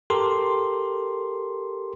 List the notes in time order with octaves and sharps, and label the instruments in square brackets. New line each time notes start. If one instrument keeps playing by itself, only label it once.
[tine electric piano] G4 A4 A#4 C6